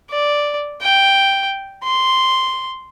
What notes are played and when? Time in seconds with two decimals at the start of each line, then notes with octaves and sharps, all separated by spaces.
0.11 D5
0.82 G5
1.84 C6